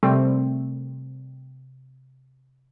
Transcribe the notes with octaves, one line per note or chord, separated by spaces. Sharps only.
C3 G3 A3 C4